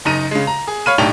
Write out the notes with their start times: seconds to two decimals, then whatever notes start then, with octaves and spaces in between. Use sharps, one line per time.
0.05 F#1 D#4 A#5 D#7
0.31 C#3 G#3
0.47 A#5
0.68 G#4
0.86 C#5 F5 B5 F6 D#7
0.98 B1 A2 D4 D#4 G4 F7